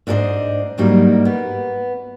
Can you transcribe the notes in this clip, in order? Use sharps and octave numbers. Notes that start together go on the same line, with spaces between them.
G#2 D4 E4 A4 C5 D#5
G#2 F#3 G3 A#3 D#4
B3